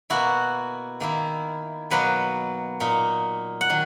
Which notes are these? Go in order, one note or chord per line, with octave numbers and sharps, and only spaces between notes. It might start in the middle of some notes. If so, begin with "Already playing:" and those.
B2 A#3 E4 F#4
D#3 A#3 E4
B2 F#3 A#3 B4
A#2 A#3 D#4
F#5
D#3 F#3